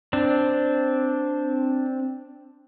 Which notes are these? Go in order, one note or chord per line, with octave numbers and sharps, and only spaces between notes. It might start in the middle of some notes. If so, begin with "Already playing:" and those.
C4 D4